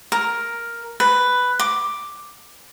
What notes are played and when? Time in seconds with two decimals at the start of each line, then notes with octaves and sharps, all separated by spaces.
0.12 A#4
1.00 B4
1.59 D6